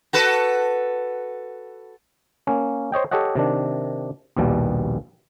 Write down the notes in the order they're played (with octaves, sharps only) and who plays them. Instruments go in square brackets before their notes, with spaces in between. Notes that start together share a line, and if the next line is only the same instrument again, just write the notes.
[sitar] F#4 A4 B4
[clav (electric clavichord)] A#3 C#4
C5 C#5 D#5 G5
G4 A4 C#5 D#5 F#5
C3 D#3 D4
A#1 D#2 B2 G3